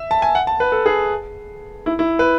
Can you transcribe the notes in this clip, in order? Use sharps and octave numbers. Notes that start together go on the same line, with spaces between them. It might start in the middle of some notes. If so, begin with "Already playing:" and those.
Already playing: E5
A5
G#5
F#5
A5
B4
A4
G#4
E4
E4
B4